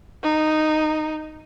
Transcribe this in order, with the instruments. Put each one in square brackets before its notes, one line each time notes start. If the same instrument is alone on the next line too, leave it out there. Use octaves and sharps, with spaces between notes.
[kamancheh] D#4